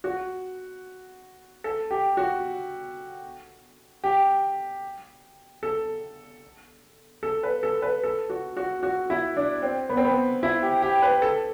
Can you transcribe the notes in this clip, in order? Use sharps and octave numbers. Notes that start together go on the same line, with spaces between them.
F#4
A4
G4
F#4
G4
A4
A4
B4
A4
B4
A4
F#4
F#4
F#4
E4
D4
C4
B3
C4
B3
E4
G4
G4
B4
A4